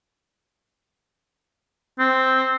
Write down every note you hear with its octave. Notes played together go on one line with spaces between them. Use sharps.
C4